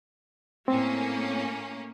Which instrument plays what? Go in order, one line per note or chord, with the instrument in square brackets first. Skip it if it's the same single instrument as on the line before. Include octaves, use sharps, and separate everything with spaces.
[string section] A2 A#3 C#4 [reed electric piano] C4